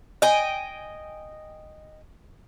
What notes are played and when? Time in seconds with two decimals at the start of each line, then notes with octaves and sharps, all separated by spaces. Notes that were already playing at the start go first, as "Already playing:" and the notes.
0.22 D#5 G5 G#5